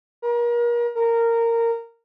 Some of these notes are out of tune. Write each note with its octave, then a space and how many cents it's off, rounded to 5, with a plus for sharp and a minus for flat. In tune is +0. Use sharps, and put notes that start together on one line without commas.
A#4 +35
A#4 -15